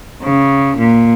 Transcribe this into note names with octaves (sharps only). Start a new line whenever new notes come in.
C#3
A#2